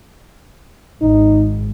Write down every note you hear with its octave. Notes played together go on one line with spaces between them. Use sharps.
G#1 D#4